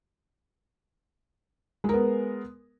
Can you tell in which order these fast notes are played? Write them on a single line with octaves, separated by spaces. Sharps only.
G#3 A#4 B3